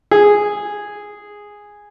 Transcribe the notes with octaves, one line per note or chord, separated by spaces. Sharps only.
G#4